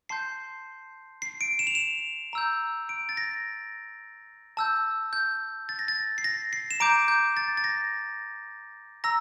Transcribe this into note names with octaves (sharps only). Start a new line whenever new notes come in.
A5 C6 G6 C7
C7
D7
E7
F7
E7
A#5 E6 G6
D7
A6
A#6
A5 E6 G6
G6
A6
A#6
A6
C7
A#6
C7
E7
A#5 D6 G6 D7
G6
A6
A6
A#6
A#5 E6 A#6